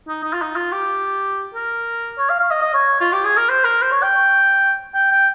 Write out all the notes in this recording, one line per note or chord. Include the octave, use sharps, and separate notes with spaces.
D#4
D#4
F4
D#4
F4
G4
A#4
C#5
F5
F5
D#5
D#5
C#5
F4
G4
G#4
A#4
C5
A#4
C5
C#5
G5
G5
G5